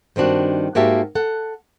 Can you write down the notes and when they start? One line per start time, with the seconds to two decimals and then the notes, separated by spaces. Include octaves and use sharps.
0.16 G2 D#3 C4 D4 F#4
0.75 G#2 A#3 F#4 G4 E5 A5
1.15 A4 F#5